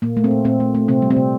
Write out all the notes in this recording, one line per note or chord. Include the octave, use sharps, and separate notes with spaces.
A#2 A#3
A3
C4
A#2
A#2 C4
A3
A3
C3 C4
G3
C4
C3